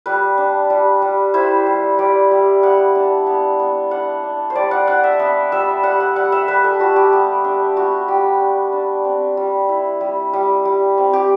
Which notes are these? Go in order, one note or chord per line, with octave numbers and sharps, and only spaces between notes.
G3 B4
D4
G3
G3
E4 C5
G3
G3 D5
G3
B3 F#5
D4
B3
B3
D4 F#5
D4
C5
G3 D5
F#5
D4 F#5
E5
B3 E5
G3 E5
G3 F#5
F#5
G3 F#5
E5
G3 B4
A4
G3 F#4
G4
B3
D4
B3 F#4
G3 G4
D4
D4
C4
G3
E4
G3
G3
G3
C4
G4